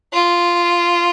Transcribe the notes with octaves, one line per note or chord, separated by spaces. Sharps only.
F4